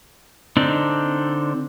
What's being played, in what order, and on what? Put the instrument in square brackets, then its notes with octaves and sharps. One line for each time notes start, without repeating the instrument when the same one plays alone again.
[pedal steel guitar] D3 C4 D4 D#4